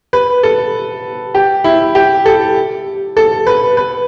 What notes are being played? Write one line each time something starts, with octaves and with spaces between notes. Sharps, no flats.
B4
A4
G4
E4
G4
A4
A4
B4
B4